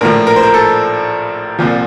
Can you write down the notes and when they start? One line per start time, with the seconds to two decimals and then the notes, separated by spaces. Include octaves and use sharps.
0.01 A#1 A2 F3 A#4
0.27 A#4
0.36 C5
0.43 A#4
0.54 A4
1.59 C2 A#2 F3